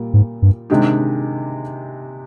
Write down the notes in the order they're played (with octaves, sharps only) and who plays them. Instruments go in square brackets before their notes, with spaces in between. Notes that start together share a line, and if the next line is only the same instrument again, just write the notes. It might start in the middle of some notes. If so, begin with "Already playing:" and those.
Already playing: [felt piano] A#2 G3 A#3
[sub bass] G#2
G2
[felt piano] C3 D#3 G#3 D4 G4